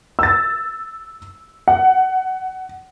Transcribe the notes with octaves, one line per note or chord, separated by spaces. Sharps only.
E6 A6
F#5